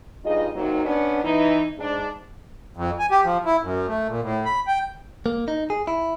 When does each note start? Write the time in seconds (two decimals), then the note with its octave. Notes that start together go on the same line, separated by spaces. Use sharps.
0.24 G2 D#4 F4 G#4 D#5
0.54 C3 F#3 A#3 D#4
0.85 B3 C#4 D4
1.23 E3 D#4
1.78 G#2 D4
2.77 F2
2.99 G#5
3.11 G4
3.24 F3
3.45 E4
3.62 F#2
3.88 A3
4.08 A#2
4.22 A2
4.45 B5
4.67 G5
5.26 A#3
5.48 D#4
5.70 G#4
5.87 E4